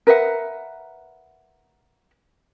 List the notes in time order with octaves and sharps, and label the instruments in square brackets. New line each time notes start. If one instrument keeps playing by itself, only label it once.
[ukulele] A#4 B4 E5 F#5